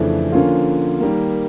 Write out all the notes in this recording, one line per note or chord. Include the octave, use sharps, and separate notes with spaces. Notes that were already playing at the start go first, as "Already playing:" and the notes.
Already playing: F2 C#3 E3 A3 D4
D3 F3 A#3 C#4 F4
D#3 G3 A#3